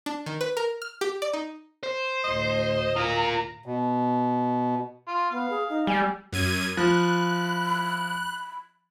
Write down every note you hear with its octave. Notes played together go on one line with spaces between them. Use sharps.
D4
D#3
B4
A#4
F6
G4
D5
D#4
C5
D2 A2 D#5
F4 A#4 A#5
B2
F4
B3 F5
G#4
D#4
G3 G#5
F#2 G#6 D#7
F3 B5 F#6